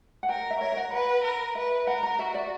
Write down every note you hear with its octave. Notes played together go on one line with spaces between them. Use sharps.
F#5
A#4 G5
E5
A#4 C#5
E5
F#5
B4 F#5
A#4
B4 E5
A#4 F#5
A#5
F#4 E5
D5